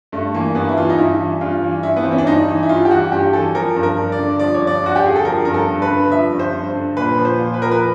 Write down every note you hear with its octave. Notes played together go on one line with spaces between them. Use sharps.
G2 A3
E3 A#3
G2 B3
E4
E3 F4
D#4
G2 E4
E3
G2 F4
E3
G2 E4
B3
E3 C4
C#4
D4
G2 D#4
E3
E4
G2 F4
G4
E3 F#4
G2 G4
E3 A4
F3 A#4
G2
A#4
G2
D5
D3
F3 D5
C#5
G2
D5
G2 F#4
G4
D3 G#4
A4
F3 A#4
G2 A#4
A4
G2
B4
D3
F3 E5
G2
C5
G2
D3
A#2 B4
F3
C5
A#2
B4
F3 A#4
B4